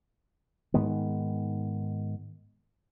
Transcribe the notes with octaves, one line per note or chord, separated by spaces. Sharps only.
G#2 D#3 G#3 B3